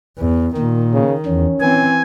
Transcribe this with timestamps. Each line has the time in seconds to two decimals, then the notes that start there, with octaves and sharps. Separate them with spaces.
0.18 E2
0.57 A#2 D#3
0.93 C#3
1.26 E2 C#4
1.60 E3 C4 G#5